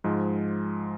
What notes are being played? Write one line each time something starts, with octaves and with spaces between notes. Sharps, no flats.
G#2 F3 G#3